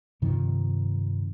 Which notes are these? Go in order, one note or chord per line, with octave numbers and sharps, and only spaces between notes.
G2 C3 D#3 F3